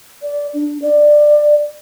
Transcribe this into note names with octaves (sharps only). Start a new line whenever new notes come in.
D5
D4
D5